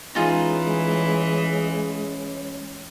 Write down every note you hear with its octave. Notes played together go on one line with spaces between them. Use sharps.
E3 G#3 C#4 D#4 F4 G#4